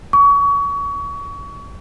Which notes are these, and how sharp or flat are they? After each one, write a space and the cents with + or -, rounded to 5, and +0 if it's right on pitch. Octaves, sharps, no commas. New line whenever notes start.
C#6 +30